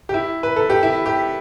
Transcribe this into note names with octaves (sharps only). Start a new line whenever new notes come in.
G4
E4
B4
A4
G4
E4
G4